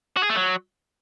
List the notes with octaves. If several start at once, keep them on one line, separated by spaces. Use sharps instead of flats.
F#4
G#4
A3
F#3